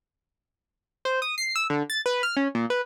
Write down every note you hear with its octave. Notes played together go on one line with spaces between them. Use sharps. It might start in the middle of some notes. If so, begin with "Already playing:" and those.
C5
D#6
C7
E6
D3
A6
B4
F6
C#4
A#2
B4